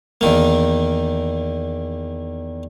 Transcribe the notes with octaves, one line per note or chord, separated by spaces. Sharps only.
E2 D#3 A#3